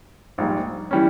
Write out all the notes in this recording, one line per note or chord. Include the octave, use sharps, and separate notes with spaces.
A#1 G#2 G3 A#3
E3 G3 C#4